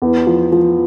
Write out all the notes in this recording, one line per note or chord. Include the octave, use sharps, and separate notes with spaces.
E2
F3
F3